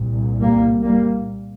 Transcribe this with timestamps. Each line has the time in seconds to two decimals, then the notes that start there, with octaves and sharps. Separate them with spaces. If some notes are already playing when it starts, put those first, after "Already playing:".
Already playing: C2 A#2
0.41 G3 A#3
0.83 G3 A#3